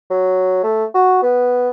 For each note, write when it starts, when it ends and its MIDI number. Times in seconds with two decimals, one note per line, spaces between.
0.10 0.62 54
0.64 0.84 57
0.95 1.19 66
1.23 1.70 59